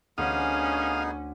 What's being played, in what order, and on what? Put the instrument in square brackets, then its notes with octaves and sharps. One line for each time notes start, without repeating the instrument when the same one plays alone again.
[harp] D2 [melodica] B3 D#4 G#4 [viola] C#4 G#5 [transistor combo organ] F5 D#6